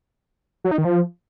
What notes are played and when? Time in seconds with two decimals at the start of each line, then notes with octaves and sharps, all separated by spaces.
0.64 F#3
0.71 D#4
0.78 D#3
0.85 F3